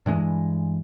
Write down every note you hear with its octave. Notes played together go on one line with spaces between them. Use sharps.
G2 E3 G#3